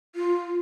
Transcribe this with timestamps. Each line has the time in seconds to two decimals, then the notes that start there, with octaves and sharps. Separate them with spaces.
0.15 F4